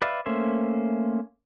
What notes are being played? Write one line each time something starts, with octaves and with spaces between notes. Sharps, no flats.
B4 D5 E5 F5
A3 A#3 C#4 C5 E5